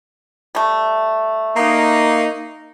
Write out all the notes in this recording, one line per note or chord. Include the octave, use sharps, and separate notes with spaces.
G3 A3
A#3 D#4